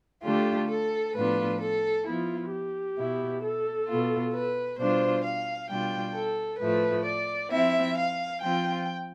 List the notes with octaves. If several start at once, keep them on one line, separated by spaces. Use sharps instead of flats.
D3 A3 D4 F4 G4
A4
A2 F3 B3 D4 F4 B4
A4
F3 B3 E4 F4
G4
B2 B3 E4
A4
B2 B3 F4
B4
B2 G3 D4 F4 C5
F5
B2 G3 D4 F4 G5
A4
A2 F3 A3 B4
D5
F3 C4 E4 E5
F5
F3 C4 F4 G5